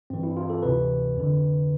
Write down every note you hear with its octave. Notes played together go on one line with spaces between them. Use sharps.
G2 E3 C4
E4
F4
A4
D2 C3 E3 B4
F2 D3